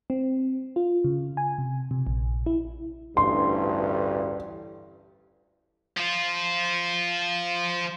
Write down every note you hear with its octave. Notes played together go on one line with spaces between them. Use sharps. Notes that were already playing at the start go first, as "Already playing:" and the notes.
C4
F4
C#3
G#5
C3
C3
A#1
E4
A1 D2 G2 C6
F3 F4